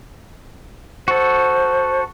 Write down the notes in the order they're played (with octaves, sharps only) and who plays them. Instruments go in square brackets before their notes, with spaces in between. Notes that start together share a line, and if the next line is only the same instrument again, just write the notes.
[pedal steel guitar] F#4 A4 [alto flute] C5